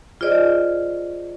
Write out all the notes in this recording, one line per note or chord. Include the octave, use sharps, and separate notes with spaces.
F4 G#4 C5 D5 D#5